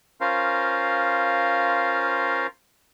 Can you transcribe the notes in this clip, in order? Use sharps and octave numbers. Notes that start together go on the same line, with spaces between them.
C#4 F4 A#4 C5 F5